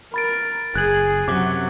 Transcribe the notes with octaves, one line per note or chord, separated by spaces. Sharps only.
A#4 B5 A6 D7
F#1 G#4 F#6 G#6 F#7
F#2 C3 F#3 F#5 D6